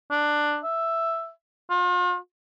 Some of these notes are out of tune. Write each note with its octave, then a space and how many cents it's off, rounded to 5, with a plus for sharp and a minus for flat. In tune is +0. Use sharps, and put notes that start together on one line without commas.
D4 +10
E5 +5
F4 +40